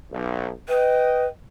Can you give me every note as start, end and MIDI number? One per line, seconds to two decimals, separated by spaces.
0.11 0.50 35
0.69 1.27 71
0.69 1.27 75
0.69 1.27 79